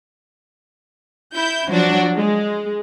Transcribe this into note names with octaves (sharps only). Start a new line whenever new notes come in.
E4 G6
F3 F#3 D4 F#4
G#3